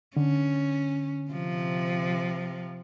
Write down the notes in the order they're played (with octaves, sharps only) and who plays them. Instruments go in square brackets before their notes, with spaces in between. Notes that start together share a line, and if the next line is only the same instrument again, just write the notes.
[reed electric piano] D3 [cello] C#4
[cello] C3 F3